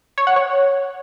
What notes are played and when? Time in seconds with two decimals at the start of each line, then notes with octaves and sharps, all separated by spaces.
0.18 C#5
0.27 F#5
0.36 C#5